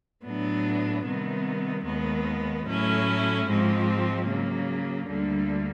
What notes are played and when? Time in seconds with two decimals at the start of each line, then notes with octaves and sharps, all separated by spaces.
0.24 A2 F#3 B3 D4
1.04 C3 D#3 G3 B3
1.84 D#2 D#3 G#3 B3
2.65 A2 F#3 A3 C#4 E4
3.46 G#2 F3 G#3 C4
4.26 C#3 F#3 A#3
5.06 D2 D3 G3 A#3